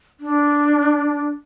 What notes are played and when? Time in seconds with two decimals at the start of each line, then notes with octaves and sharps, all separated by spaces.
0.20 D4